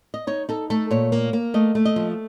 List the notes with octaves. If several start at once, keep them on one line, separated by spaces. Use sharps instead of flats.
D#5
D#4 C#5
D#4 A4
A3 A4
A#2 C#5
A#3
A#3
A3 D#5
A3
D#5
F3